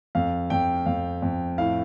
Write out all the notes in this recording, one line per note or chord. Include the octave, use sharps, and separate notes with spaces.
F2 F5
F2 G5
F2 F5
F2
A2 F5